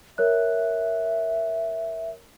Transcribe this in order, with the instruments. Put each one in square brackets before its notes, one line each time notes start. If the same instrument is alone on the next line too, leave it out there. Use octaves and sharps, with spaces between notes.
[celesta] A#4 C#5 F#6 [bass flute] E5